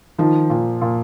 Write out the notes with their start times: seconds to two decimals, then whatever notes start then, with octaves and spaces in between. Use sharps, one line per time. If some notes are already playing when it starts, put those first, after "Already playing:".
0.18 D#3 F3
0.50 A#2
0.82 A#2